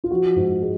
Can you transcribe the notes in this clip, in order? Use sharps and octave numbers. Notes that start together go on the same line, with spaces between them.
F4
F3 F#4
G#2
G#3